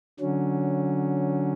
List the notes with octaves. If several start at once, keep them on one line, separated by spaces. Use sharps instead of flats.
D3 F#3 C#4